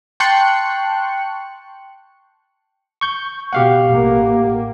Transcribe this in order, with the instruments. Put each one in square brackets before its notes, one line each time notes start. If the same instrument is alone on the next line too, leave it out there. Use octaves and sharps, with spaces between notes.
[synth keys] G5 A5 C6 C#6 F#6 C#7
[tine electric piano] C#6 G6
[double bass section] B2 [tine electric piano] G4 F5 F#5
[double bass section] A1 A2 A#3